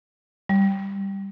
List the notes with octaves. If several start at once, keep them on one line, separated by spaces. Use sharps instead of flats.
G3